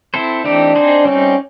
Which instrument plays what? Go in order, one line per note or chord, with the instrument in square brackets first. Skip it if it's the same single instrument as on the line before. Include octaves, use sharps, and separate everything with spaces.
[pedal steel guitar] C4 E4 A4 C5
[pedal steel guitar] E3 A3 C4 D#4 G4 [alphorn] D4
[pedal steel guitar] C4 D#4 G#4 C5
[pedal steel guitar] G3 C4 D#4 [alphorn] C#4